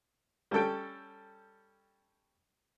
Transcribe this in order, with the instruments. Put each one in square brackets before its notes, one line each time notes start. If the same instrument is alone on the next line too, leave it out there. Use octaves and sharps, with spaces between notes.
[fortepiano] G3 C#4 A4 G5